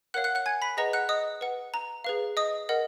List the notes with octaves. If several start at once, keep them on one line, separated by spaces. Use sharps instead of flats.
A#4 C#5 F5 F#5 F#6
F#5 F#6
F#5 F#6
G#5 G#6
B5 B6
G#4 B4 D#5 F#5 A#5 A#6
F#5 F#6
D#5 D#6
B4 F#5
A#5
G#4 B4 F5
D#5 D#6
A#4 D#5 F#5